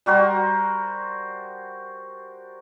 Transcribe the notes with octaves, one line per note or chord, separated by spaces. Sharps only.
G3 F#4 A#4 C5